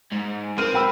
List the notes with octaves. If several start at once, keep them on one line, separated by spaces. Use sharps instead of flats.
G#2
C4 A#4 F6 D#7
G5 B5 E6